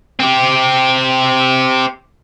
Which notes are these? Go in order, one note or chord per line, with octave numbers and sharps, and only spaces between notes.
C4 G4